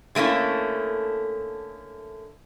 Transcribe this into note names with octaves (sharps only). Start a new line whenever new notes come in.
D3 A3 A#3 C#4 E4